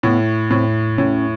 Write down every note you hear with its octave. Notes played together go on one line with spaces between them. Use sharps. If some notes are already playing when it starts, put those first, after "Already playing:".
A2 B3
A2 C4
A2 C#4